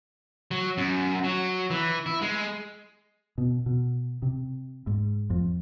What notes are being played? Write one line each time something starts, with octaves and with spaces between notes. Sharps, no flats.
F#3
F#2
F#3
E3
E4
G#3
B2
B2
C3
G#2
F2